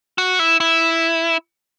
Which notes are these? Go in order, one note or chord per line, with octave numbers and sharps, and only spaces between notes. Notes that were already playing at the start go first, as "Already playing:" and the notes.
F#4
E4
E4